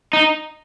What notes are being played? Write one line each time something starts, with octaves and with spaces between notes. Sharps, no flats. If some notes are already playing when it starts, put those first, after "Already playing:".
D#4